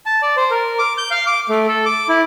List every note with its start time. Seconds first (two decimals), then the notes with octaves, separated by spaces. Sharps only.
0.06 A5
0.22 D5
0.37 C5
0.51 A#4
0.78 D6
0.98 G6
1.11 F5
1.26 D6
1.49 A3
1.68 A4
1.86 D6
2.09 E4